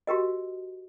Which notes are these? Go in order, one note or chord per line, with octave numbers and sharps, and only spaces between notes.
F#4 G4 A#4 D#5